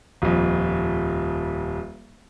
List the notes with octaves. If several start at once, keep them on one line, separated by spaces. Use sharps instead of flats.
D#1 F2